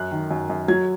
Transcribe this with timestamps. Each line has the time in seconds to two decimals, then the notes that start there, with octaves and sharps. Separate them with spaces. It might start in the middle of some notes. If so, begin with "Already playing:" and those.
Already playing: F#2 F#6
0.11 D#3
0.31 F#2
0.50 F#2
0.68 F#3 G#6